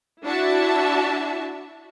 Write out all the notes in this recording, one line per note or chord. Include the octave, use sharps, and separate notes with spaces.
D4 E4 F#4 E5 A5